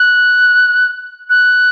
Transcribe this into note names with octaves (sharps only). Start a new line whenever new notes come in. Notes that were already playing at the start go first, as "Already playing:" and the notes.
Already playing: F#6
F#6